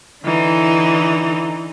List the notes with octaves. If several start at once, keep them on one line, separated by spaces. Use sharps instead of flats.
D3 E3 D#4